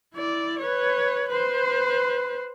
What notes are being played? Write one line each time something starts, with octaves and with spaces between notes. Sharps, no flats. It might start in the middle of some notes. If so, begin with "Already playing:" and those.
E4 D5
B4 C#5
B4 C5